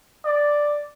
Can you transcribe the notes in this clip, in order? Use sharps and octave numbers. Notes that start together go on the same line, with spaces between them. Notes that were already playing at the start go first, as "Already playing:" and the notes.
D5